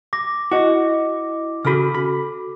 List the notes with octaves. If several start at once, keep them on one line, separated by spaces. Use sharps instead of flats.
D6 A#6
E4 F#4 D#5
C#3 F#4 A4 B5 F6
B5